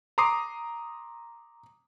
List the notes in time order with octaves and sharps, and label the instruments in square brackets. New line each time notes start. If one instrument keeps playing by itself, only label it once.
[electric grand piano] A#5 C6 D6 D#6 C7